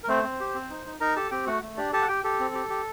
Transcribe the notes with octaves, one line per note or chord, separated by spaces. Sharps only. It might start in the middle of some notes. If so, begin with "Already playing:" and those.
A#4
A3 C4 C5
C4
G4
C4
D#4
D#4
D#4 A#4 A#5
G4 A4 A5
C4 G4 G5
A3 F#4 F#5
A3
D4 G4 D5
G4 A4 A5
F#5
G4 G5
G4 A4
C4
G4
G4